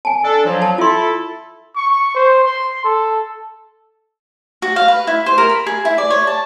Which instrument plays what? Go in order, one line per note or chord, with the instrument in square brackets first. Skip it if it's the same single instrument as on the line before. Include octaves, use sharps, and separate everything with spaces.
[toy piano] G#5 A5
[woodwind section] D4 A4
F3 F#3
[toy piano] A5
[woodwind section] E4 A4 [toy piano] F4 C6
[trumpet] C#6
C5
C6
A4
[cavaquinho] F#4
F5
B4
E4
C5
A#4
B5
G#4
E4
D5
C#5
A5